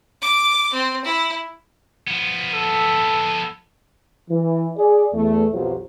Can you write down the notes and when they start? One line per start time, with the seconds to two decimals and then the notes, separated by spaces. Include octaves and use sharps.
0.22 D6
0.73 C4
1.04 E4
2.07 F3 B3
2.53 A4
4.30 E3
4.77 G#4 D5
5.14 E2 A3
5.52 B1 F2 F#3 F4 G4 C5